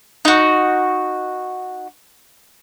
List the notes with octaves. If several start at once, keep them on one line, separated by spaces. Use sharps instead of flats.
D#4 F#4